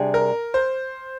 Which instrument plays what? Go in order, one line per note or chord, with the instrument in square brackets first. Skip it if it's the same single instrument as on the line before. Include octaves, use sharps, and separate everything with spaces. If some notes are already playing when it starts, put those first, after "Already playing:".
Already playing: [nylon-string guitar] C3 G3 D4 G#4
[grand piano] A#4
C5